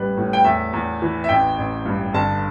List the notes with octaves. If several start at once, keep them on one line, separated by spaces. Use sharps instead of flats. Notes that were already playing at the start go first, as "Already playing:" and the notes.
Already playing: A1 G3 B4
A2
G5
E2 E5
E2
E3
E5
A1 G5
A1
G2
G1 A5